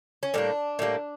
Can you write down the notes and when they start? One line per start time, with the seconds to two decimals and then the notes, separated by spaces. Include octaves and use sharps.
0.23 C#4
0.34 A2 G3 A#3 D4
0.79 A2 G3 A#3